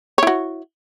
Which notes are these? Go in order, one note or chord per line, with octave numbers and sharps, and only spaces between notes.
E4 F#4 C#5